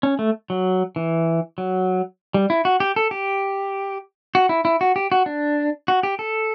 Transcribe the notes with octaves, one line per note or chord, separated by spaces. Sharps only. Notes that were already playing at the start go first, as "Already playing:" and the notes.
C#4
A3
F#3
E3
F#3
G3
E4
F#4
G4
A4
G4
F#4
E4
E4
F#4
G4
F#4
D4
F#4
G4
A4